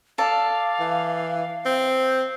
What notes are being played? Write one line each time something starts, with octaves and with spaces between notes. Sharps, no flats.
A4 D5 F5
E3
C4